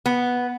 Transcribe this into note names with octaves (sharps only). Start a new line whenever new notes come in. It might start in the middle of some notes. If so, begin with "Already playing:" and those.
B3